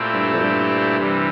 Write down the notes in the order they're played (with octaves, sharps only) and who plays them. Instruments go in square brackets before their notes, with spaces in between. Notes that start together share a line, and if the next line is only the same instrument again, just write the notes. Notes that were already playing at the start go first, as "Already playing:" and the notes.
Already playing: [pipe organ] A#2 A3 C4 E4 G4
[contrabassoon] G2
F2
G2
[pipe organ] C3 E3 G3